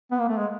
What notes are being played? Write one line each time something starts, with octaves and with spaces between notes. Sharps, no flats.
B3
A#3
A3
G#3